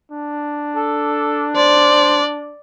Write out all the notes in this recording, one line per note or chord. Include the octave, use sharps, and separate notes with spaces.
D4
A4
C5 D5